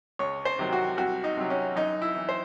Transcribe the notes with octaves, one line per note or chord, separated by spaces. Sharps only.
C#2 C#5
C5
C3 D#3 F#3
F#4
C2 F#4
D#4
C3 F#3
C#4
F#2 D#4
E4
E3
C5